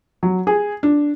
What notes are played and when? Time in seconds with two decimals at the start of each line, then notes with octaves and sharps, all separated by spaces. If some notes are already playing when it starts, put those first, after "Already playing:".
0.23 F#3
0.47 G#4
0.83 D4